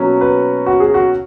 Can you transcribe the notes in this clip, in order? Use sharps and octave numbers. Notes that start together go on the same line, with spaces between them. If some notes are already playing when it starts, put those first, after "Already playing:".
Already playing: B2 F#3 A#3 C#4
B4
F#4
G#4
F#4